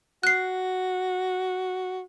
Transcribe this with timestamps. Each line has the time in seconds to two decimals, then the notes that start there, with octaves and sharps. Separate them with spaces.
0.23 F#4 F#6 C7